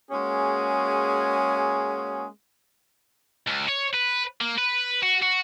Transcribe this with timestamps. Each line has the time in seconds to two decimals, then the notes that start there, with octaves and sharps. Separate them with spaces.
0.11 G#3 A#3 C#4 F#4 G#4
3.47 C#2
3.68 C#5
3.94 B4
4.41 A#3
4.58 B4
5.03 F#4
5.22 F#4